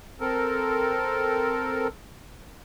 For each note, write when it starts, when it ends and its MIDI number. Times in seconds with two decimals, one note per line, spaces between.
0.21 1.87 60
0.21 1.87 69
0.21 1.87 70